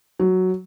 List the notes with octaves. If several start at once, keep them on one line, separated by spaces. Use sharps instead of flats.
F#3